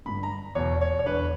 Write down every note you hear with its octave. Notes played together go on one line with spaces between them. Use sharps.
G2 D3 B5
A#5
E2 B2 C#5
C#5
C#5
E2 D3 B4